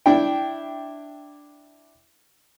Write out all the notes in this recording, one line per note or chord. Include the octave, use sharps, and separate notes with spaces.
D4 E4 G5